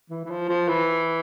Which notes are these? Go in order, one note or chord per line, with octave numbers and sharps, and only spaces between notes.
E3
E3
F3
F3
E3